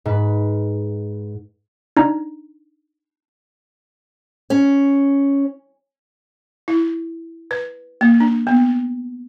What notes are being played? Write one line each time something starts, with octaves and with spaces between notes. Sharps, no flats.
G#2 B4
D4 D#4 A#5
C#4
E4
B4
A#3
D4
B3